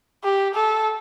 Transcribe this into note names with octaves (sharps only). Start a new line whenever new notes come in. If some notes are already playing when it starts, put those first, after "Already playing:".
G4
A4